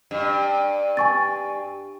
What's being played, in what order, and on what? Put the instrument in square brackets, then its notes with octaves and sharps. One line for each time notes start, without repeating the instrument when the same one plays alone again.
[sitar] G2
[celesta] G#5 C#6 A6